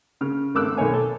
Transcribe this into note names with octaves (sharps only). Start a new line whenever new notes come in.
C#3 F6
G#1 A3 D6 E6 F#6
B1 D#3 D#4 C#5 G#5
A4